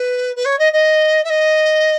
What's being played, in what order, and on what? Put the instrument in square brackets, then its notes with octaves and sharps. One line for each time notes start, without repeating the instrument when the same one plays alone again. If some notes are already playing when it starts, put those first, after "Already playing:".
Already playing: [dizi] B4
B4
C#5
D#5
D#5
E5
D#5